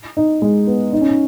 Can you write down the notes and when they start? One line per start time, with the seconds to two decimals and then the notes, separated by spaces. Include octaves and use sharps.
0.17 D#4
0.42 G#3
0.67 B3
0.93 D#4
1.01 C#4
1.08 D#4